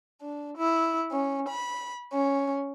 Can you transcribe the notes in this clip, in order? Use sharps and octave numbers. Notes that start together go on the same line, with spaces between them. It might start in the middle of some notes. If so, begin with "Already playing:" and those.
D4
E4
C#4
B5
C#4